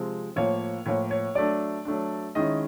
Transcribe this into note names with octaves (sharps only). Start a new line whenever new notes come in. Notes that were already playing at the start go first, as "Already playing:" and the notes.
Already playing: C3 F3 G#3 C4
A2 F3 A#3 C#5
A2 F3 A#3 C#5
C#5
F#3 A3 D4 D5
F#3 A3 D4
D#3 G#3 C#4 E4 D#5